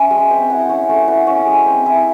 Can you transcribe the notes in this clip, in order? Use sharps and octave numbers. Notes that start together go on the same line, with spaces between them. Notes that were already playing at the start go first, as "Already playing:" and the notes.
Already playing: C#4 E5
G#3
C4
E4 F#5
C#4
A3
E4 F#5
C#4
G#3
C4
E4